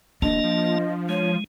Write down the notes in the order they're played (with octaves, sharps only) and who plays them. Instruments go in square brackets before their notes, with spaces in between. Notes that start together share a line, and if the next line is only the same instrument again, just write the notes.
[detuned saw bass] D1 [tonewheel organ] A#3 A5 [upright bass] D4 [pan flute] D#5
[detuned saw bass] F3
[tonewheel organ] G#3 [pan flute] C#5